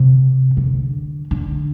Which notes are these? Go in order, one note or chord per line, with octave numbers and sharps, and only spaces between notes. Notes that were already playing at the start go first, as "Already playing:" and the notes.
Already playing: C3
D3
D3